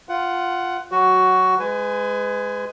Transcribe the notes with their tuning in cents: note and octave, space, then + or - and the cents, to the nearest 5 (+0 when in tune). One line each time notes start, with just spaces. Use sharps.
F4 +0 F#5 +15
F#3 +0 F#4 +10
G#3 +0 B4 +35 G#5 +0